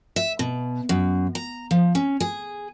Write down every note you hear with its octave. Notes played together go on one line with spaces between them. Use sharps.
E5
B2
F#2
A#5
F3
C#4
G#4